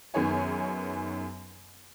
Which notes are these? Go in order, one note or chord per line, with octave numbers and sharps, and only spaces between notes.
F#2 D#3 B3 G#4 C#5 G#5